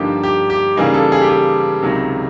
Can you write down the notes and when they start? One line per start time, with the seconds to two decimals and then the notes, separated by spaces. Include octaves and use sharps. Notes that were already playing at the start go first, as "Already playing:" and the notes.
Already playing: G2 D3 F3 A#3 D#4 G4
0.23 G4
0.50 G4
0.76 C#3 E3 G3 A#3 D#4 G#4
0.94 A4
1.12 G#4
1.22 G4
1.29 G#4
1.82 C#2 C3 D#3 F#3